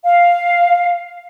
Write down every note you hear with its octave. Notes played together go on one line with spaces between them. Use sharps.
F5